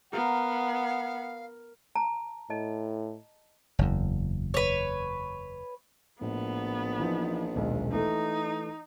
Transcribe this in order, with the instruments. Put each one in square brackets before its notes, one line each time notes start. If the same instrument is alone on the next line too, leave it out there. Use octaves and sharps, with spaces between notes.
[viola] B3 [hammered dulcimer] A#4 [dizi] F5 [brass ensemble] F#5
[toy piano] A5 A#5
[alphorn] A2 [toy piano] D#5 A5
[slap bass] F#1 E2
[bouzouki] B4 C#5
[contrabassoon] A#1 [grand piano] A2 [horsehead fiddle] B3
[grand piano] E3 F3 D#4
D#1 B1 G#3
[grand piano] E3 A3 [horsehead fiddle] D#4